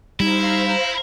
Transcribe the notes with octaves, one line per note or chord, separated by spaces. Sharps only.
G3 D#4 E4 C5 F5 A#5